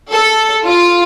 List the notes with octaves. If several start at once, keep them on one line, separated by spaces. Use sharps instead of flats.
A4
F4